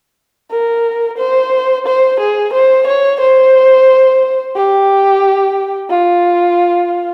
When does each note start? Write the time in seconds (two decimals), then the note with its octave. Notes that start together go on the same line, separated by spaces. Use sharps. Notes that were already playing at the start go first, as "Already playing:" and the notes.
0.51 A#4
1.18 C5
1.86 C5
2.20 G#4
2.53 C5
2.87 C#5
3.20 C5
4.56 G4
5.90 F4